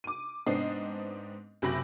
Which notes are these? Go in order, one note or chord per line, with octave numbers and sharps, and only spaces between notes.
D6 D#7
G#2 B3 C4 D4 D#5 C7
F#1 C3 F#3 B5 A#6 F#7